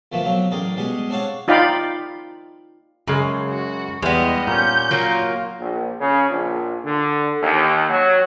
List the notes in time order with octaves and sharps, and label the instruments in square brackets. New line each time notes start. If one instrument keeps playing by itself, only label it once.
[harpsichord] D2 A#2 E3 F3 A3 A#3
B1 F#3 C4 G5
A1 G#4 A#4 D5 G5
B2 G3 G#3 G#4 G#5
C4 D4 C#5 F5 F#5
[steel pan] D#4 F4 D5 F5 G5 B5
[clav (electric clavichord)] F#2 G#3 [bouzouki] C#3
[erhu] F#4
[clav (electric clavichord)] E2 G#3 [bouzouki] G3 B3 [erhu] D#5
[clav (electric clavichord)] A#2 C#4 [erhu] G6
[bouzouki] F#3 A#3 F4
[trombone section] A#1
C#3
A#1
D3
D#2
F#3